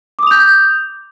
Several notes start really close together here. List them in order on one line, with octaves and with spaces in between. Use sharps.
D6 D#6 F7 G6